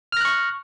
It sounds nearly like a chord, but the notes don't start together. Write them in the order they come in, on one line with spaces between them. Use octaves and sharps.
F6 A#6 F#6 C#6